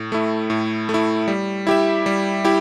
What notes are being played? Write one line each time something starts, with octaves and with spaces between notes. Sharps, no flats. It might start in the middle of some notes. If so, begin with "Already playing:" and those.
Already playing: A2
A3 E4
A2
A3
E4
G3
E4 G4 E5
G3
E4 G4